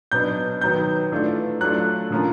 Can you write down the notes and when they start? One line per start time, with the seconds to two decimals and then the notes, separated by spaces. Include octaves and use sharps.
0.12 B2 F#3 B3 D4 G6
0.61 D#3 F#3 B3 G6
1.12 E3 A3 D4 F4
1.60 F#3 A3 D4 F4 F#6
2.10 D3 F3 A#3 C#4 F4